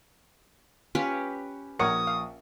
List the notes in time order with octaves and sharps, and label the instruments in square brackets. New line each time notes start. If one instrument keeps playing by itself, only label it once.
[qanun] C#4 G4 B4 [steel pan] F4
[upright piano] A#1 C#6 C#7 [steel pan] A#4 C#5 F#5 [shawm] D#6
[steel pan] F5